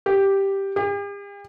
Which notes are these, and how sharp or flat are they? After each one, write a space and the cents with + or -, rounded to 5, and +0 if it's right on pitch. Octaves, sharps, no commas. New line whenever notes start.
G4 +0
G4 +45